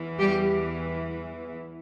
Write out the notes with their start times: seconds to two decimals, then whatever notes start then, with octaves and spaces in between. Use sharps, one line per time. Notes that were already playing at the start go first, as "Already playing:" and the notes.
Already playing: E2 E3
0.18 G3 G4